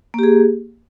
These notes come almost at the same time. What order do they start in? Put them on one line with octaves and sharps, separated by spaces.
A#3 G4 G#4